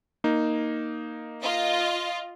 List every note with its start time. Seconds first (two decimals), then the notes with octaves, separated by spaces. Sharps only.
0.24 A#3 D#4
1.42 F4 D#5